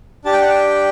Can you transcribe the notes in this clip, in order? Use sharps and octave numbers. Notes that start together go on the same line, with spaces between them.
D4 G4 A5
G5
F#5
G5